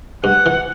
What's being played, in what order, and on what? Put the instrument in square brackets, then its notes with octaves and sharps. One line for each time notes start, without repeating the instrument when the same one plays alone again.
[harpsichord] G2 [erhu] F#5
[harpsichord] E3